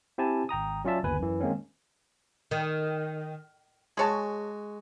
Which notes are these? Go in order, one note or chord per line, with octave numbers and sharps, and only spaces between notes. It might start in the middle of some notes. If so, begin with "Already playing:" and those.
C4 E4 G4 G#5 A5
G#1 G5 A#5 D#6
F#3 C#4 F4 D5 E5 A5
G1 D#2 B4 G#5
F#2 E3
D#3 G#3 A#3 C4 C#4
D#3
G#3 F#4 G#4 C#5 A5